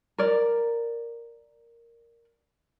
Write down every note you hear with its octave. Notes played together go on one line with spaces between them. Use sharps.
A#4 D5